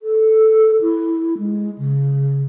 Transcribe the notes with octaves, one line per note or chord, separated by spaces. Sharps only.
A4
E4
G#3
C#3